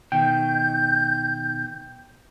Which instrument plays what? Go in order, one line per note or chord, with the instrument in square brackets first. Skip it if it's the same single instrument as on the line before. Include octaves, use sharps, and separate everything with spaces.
[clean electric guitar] B2 D#3 [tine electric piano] G5 [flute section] G6